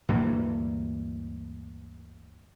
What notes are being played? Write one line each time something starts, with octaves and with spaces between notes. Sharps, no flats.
D2 G2 E3 A#3